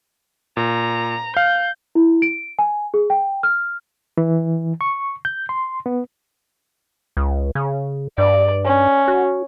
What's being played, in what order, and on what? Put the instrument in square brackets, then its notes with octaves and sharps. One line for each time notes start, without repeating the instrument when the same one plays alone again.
[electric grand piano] A#2 [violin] A#5
[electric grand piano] F5 [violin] G6
[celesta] E4
D7
G#5
G#4
G5
F6
[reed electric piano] E3
C#6
G6
C6
B3
[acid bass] C#2
C#3
[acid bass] G2 [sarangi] D5
[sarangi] C#4
[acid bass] F#4